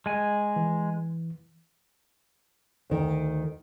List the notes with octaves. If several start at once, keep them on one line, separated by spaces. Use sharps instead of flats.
G#3 G#5
E3
D2 D#3